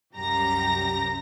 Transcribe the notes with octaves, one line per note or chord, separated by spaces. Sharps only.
C2 F#2 G4 A#5 A#6